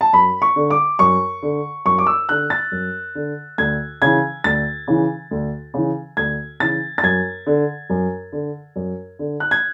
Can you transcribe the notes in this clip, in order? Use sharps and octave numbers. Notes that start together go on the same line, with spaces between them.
A5
F#2 B5
C#6
D3
D6
F#2 C#6
D3
F#2 C#6
D6
E6
D3 F#6
A6
F#2
D3
D2 G#6
C#3 E3 G#6
D2 A6
C#3 E3
D2
C#3 E3
D2 G#6
C#3 E3 A6
A6
F#2 G#6
D3
F#2
D3
F#2
D3
F#6
G#6